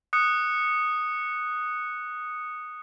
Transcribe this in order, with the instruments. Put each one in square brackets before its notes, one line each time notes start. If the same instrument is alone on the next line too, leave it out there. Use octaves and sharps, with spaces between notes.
[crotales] D#6 F#6 C#7